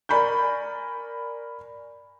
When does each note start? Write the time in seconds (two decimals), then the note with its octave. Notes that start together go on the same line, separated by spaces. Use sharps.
0.09 A#4 D5 G#5 B5 C#6 G6